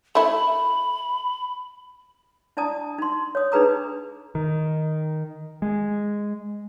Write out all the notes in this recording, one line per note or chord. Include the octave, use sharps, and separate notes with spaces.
A3 E4 B5
D4 E4 D5 A5 A#5 D#6
D#4 C6
C#5 D#6
D4 D#4 G#4 B4 A#5 D#6
D#3
G#3